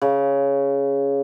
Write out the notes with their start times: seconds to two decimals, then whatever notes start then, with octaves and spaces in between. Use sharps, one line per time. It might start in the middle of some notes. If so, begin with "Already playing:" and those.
0.02 C#3